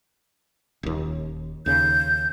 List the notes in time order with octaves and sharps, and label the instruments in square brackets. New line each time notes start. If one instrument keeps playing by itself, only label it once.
[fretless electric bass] D#1 D#2
[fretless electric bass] D#2 C#3 [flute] G6